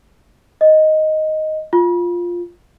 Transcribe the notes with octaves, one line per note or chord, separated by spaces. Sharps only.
D#5
F4